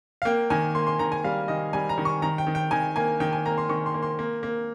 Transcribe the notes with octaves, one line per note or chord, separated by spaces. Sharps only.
F5
A#3 G5
D#3 G#5
A#3 C6
C6
D#3 A#5
G#5
G3 F5
D#3 D#5
G3 G#5
A#5
D#3
C#6
D#3 A#5
G5
D#3
G5
D#3 G#5
A#3 G#5
D#3 G5
G#5
A#3 A#5
C6
D#3 C#6
C6
A#3
C6
A#3
A#3